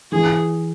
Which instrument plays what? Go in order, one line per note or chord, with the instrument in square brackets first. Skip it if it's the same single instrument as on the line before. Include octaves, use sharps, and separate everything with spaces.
[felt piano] E3 [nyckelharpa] G#4